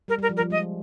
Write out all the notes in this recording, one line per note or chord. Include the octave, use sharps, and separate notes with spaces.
G3 A#4
G3 A#4
F3
A#4
F3
G#3 D#5